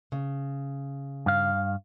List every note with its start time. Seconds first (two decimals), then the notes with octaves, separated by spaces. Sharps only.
0.12 C#3
1.26 G2 F5